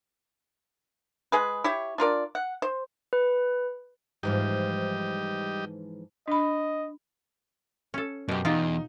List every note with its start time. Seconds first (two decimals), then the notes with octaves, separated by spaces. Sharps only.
1.32 G#3 G#4 B4
1.64 E4 G4 C#5
1.98 D4 F4 A#4 D5
2.35 F#5
2.62 C5
3.13 B4
4.23 G#2 E3 F3 G3 G4 D#5
6.28 D4 D#5 B5
7.94 C#4 A4
8.29 F#2 B2 G4
8.45 E2 D#4 F4 G4